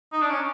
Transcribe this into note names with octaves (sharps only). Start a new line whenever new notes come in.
D#4
D4
C#4